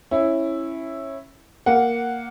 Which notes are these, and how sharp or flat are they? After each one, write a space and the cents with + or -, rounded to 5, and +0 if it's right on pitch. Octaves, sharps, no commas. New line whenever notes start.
C#4 -20 E4 +0
A#3 +0 F#5 +0